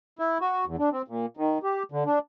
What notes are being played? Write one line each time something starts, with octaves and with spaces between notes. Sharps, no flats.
E4
F#4
E2
D4
C4
A#2
D#3
G4
D3
D4